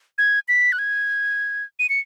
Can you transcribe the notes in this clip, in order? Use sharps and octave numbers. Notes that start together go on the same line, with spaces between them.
G#6
B6
F#6
G#6
D#7
C#7